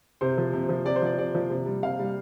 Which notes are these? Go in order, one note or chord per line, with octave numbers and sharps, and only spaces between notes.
C3 C5
F3
C3
F3
C3 D5
C5
F3 D5
C3 D5
F3
C3
G3
C3 F5
G3